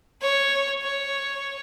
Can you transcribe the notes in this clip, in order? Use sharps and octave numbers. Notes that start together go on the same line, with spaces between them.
C#5
C#5